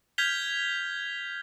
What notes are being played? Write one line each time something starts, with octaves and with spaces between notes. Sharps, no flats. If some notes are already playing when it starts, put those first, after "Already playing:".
F6 G6 G#6 B6 F7 G7